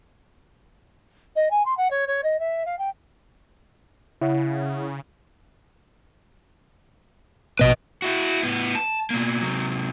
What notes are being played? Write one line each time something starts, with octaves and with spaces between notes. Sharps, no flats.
D#5
G#5
C6
F#5
C#5
C#5
D#5
E5
F5
G5
C#3 E4 C#5 F#5
A#1 B2 B3 B4 D#5
E4 F#4
A2 B3
A5
B2 A#3
C3 F#3